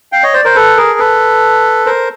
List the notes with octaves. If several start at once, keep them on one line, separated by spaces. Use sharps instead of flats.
F5 G5
C#5 D#5
C5 D5
A#4 C5
A4 B4
G#4 A#4
A4 B4
A#4 C5